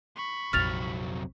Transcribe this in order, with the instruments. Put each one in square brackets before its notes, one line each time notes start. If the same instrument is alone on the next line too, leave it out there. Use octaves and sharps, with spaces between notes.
[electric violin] B5 C#6
[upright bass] A#1 F2 [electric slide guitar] C3 F#3 C4 [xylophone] F6 A6 F7